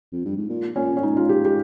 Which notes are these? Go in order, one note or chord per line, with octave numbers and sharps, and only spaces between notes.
F2
G2
G#2
A#2
A#2 C#4
C#4
G#2 D#4
F4
G4
G4